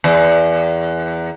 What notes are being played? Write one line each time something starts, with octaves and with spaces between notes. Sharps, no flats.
E2